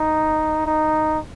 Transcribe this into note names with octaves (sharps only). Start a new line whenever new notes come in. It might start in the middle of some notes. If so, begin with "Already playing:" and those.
Already playing: D#4
D#4